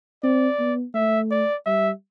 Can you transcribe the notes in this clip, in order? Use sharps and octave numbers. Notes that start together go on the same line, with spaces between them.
C4 D5
B3
A3 E5
D5
G3 E5